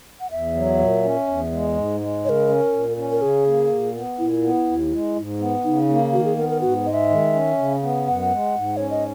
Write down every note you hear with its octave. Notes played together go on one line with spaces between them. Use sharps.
F#5
E2 E5
F#3
A#2
C#4
E2
G#3
G#2
G#3
C#3 A#4 C#5
C#4
A#2
C#4
A#4
C#3 G#4
A#3
A#2
B3
A#2 E4
B3
D#2
G#3
G#2
B3
C#3 D#4
A#3
D#3 F#4
G#4
B3 A#4
A#4
G#2 F#4
G#3 D#5
E5
D#3
C#4
C#3
B3
F#2 F#5
G#3
G#2
C#4 C#5
D#5